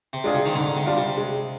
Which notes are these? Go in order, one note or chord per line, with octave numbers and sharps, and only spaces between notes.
C3
G#3 D4 F4 G#4
C3
D#3
G#2 D3
C3
G3 D4 F4
C3
G#3